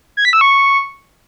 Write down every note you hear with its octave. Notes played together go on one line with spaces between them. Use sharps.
G#6
B6
E6
C#6